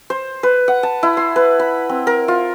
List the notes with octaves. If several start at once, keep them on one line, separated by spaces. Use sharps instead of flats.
C5
B4
F#5
A5
E4
C6
B4
B5
C4
A#4
F4